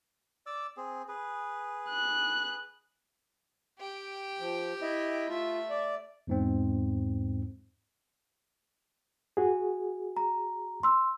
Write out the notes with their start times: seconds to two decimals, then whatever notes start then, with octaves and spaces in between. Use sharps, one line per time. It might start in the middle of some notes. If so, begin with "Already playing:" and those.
0.46 D5 D6 E6
0.77 C4 G#4
1.08 G#4 B4
1.90 F#6
3.79 G4 G5
4.40 F3
4.82 E4 D#5 E5
5.29 A3 F4 E5
5.70 D5
6.27 E2 G#2 C4
9.37 F#4 G#4
10.17 A#5
10.83 C6 E6